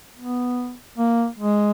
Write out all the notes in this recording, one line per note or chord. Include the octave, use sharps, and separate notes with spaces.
B3
A#3
G#3